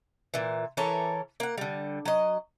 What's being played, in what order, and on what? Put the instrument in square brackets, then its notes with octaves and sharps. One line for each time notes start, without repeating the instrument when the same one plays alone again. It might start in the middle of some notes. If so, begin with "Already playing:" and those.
[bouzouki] A#2 E3
E3 A4 A#4 C#5
A#3 F#5
D3 G3
F#3 D#5